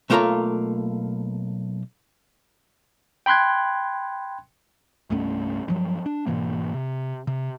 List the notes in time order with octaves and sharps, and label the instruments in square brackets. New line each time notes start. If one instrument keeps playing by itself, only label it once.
[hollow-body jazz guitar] B1 A3 A#3 F4 C#5 A#5
[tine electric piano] G5 B5 C6 F#6 G#6
[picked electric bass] C2 G2 A3 C#4
G2 F3 F#3
D4
G#2 B2 E3 A#3
C3
C3